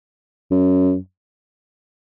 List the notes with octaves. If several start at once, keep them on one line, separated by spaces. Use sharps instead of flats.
F#2